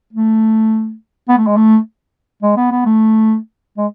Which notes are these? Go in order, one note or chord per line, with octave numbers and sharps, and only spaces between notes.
A3
B3
A3
G#3
A3
G#3
B3
B3
A3
G#3